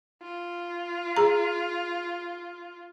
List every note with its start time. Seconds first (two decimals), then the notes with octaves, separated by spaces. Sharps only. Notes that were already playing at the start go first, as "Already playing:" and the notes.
0.22 F4
1.17 G#4 A#5